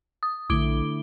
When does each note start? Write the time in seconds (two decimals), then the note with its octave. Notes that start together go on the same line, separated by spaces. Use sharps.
0.23 D#6
0.50 A#1 D3 A3 E4 D6 D7 G7